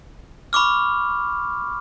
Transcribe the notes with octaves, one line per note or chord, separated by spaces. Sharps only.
B5 C#6 D6 F6